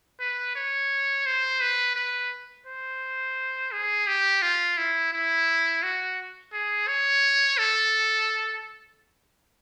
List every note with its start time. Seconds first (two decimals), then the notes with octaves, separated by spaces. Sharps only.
0.20 B4
0.55 C#5
1.26 C5
1.61 B4
1.96 B4
2.66 C5
3.72 G#4
4.07 G4
4.42 F4
4.77 E4
5.13 E4
5.83 F#4
6.52 G#4
6.88 C#5
7.58 A4